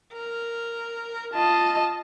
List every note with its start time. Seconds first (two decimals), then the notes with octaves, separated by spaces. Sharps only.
0.13 A#4
1.34 F4 D#5 A5